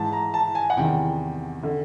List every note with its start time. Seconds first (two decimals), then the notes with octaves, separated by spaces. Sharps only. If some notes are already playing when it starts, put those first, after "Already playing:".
Already playing: G#2 E3 A5
0.12 A#5
0.34 A5
0.55 G#5
0.70 F#5
0.76 E2 C3 D#3 G5
1.63 D3